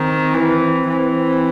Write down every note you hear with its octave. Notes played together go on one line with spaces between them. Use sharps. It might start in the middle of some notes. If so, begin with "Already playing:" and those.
Already playing: D#3 C4
E3
E3